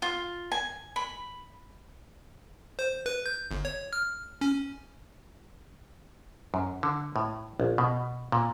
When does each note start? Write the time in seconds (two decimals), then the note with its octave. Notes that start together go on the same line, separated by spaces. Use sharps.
0.02 F4
0.52 G#5
0.96 B5
2.79 C5
3.06 B4
3.26 G6
3.51 G1
3.65 C#5
3.93 F6
4.41 C#4
6.54 F#2
6.83 D3
7.16 A2
7.60 A#1
7.78 B2
8.32 A#2